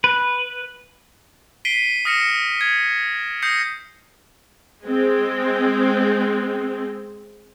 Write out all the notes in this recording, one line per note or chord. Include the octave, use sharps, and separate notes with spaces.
B4
B6 C7 D7 D#7 G7
D#6 F6 A#6 C7 C#7 E7
G#6
D#6 G6 A#6 C7 C#7
G#3 C4